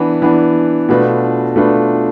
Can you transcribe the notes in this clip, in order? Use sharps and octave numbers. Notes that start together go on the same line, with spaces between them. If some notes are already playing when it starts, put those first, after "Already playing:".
Already playing: E3 B3 D4
E3 B3 D4
B2 A3 D4 F4 B4
B2 A3 D4 F4 B4